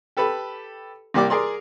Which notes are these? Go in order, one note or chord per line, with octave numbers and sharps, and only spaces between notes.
G4 A4 B4 B5
C2 A#3 G4 D5 D6
G#4 A#4 D5 C6